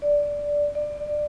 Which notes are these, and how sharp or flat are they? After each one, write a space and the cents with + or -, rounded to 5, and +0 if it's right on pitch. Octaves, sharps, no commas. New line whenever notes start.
D5 -5
D5 +20